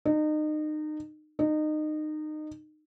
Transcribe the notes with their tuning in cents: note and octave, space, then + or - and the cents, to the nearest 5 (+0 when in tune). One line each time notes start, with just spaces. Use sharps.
D#4 -30
D#4 -25